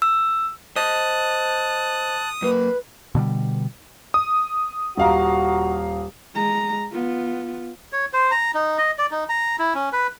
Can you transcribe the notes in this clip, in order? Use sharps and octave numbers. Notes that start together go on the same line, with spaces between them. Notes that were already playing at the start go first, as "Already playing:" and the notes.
E6
C5 D#5 A5 D#6 F#6
F#2 A#3 B4
B2 D3 E3 G3
D#6
D#1 F#4 F5 A#5
G#3 A#5
B3 F4
C#5
C5
A#5
D#4
D#5
D5
D#4
A#5
E4
C#4
B4